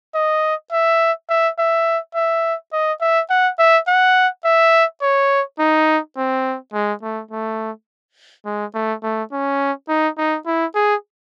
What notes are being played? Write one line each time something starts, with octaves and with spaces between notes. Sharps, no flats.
D#5
E5
E5
E5
E5
D#5
E5
F#5
E5
F#5
E5
C#5
D#4
C4
G#3
A3
A3
G#3
A3
A3
C#4
D#4
D#4
E4
G#4